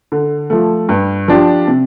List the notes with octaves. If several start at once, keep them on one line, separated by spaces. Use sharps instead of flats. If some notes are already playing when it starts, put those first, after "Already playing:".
D3
F3 A3
G2
F3 D4 G4
C3